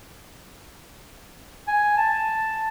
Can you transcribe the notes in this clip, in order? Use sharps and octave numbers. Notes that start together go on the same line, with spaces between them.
G#5
A5